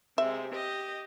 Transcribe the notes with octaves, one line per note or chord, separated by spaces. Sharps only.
C3 G#3 E5
G4 D#5